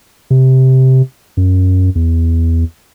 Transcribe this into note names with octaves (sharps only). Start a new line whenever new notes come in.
C3
F#2
E2